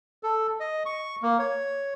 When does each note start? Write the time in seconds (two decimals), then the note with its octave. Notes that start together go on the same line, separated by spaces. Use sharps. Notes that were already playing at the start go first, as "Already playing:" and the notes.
0.23 A4
0.60 D#5
0.85 C#6
1.22 A#3
1.39 C#5